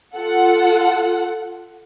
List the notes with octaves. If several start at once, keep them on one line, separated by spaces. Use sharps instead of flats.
F4 A4 F#5